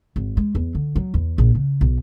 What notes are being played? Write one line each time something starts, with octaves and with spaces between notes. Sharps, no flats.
G#1
G#3
E2
D3
F#3
E2
A#1
C#3
B1